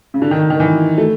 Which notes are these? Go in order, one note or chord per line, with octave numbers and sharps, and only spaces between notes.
C#3
D3
D#3
D#3
E3
A3